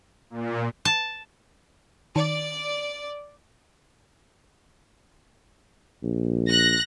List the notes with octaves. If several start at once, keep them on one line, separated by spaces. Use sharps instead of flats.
A#2
A5
D#3 D5
A#1
F#6 A#6